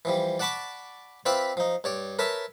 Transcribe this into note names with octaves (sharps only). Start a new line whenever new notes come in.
E3 F3 G3
D5 F#5 A5 B5 C#6 D6
C4 F4 B4 D5 E5 B5
F3 D#4
G2 C#5 D5
A#4 B4 C#5 E5 A5